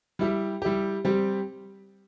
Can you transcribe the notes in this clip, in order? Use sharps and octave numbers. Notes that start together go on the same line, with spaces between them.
G3 E4 G4
G3 E4 G4
G3 C4 G4